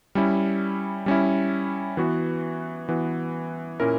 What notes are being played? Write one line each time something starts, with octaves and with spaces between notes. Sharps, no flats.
G3 C#4 E4
G3 C#4 E4
E3 B3 F#4
E3 B3 F#4
A#2 A#3 C#4 E4 A#4